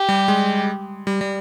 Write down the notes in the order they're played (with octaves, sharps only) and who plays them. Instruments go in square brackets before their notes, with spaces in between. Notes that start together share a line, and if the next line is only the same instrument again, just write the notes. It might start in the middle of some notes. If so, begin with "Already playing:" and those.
Already playing: [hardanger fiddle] G4
[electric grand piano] G3
G#3
G3
G3